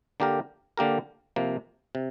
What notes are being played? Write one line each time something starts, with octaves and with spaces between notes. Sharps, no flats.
D3 A#3 G4 A#4
D3 A#3 G4 A#4
C3 F3 A#3
C3